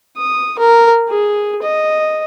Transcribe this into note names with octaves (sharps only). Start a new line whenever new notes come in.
D#6
A#4
G#4
D#5